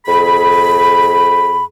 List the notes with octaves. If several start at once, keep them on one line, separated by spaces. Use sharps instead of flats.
F2 G#4 B5